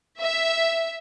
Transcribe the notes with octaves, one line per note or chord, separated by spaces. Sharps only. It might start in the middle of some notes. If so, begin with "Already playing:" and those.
E5